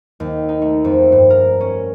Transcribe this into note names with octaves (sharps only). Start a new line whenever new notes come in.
D#2
D#4
A3
F2
G2
A#4
C#4